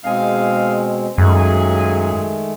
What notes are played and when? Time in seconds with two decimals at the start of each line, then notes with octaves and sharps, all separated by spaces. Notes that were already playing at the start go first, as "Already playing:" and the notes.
0.04 B2 G#3 C4 D#4 G#4 F5
1.18 F#2 A#2 D#3 F#3 G#3 A3 G#4